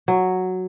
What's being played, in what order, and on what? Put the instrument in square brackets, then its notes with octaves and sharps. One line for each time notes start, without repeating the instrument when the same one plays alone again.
[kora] F#3